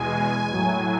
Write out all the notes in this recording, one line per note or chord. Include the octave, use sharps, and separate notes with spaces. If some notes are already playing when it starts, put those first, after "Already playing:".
Already playing: E2 B2 G#3 G#5
A2 F#3